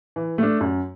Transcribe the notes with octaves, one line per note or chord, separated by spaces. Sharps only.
E3
A3 D4
F#2